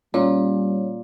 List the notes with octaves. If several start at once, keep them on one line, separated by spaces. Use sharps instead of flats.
A#2 G3 C#4